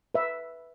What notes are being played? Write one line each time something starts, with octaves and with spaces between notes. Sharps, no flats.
B4 E5